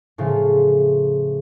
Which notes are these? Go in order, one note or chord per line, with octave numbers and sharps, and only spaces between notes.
A2 C#3 F3 F4